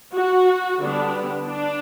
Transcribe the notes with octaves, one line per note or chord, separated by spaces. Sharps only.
F#4
D3 G3 B3 D4
D4